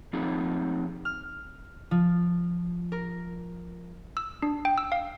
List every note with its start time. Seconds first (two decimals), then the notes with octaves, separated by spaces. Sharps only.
0.13 F3 C4 D#4 G#4
1.05 F6
1.91 F3
2.92 A#4
4.17 E6
4.42 D4
4.65 G5
4.78 E6
4.92 F5